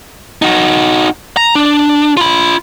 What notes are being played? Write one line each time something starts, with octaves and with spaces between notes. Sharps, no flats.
D#4 F#4
A#5
D4
F4 B5